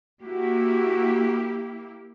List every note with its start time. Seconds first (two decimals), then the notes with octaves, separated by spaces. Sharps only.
0.22 A#3 E4 F#4 G4